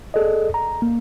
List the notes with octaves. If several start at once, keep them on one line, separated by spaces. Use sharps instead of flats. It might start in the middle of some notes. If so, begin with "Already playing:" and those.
G#4 A4 D5 D#5
A#5
A#3